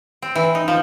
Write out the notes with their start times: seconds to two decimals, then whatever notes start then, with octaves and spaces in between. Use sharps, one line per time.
0.22 C4
0.35 E3
0.55 D#4
0.68 F3